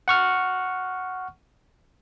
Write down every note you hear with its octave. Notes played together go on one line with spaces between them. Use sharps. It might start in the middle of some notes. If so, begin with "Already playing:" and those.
F#5 C#6 F6